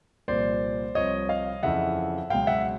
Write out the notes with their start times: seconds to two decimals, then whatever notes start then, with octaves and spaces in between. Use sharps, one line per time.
0.28 C2 A#2 F3 C5 D5
0.95 C2 C3 F3 C#5 D#5
1.29 D#5 F5
1.63 F2 C#3 E3 E5 F#5
2.30 C#2 B2 F#3 F5 G5
2.47 E5 F#5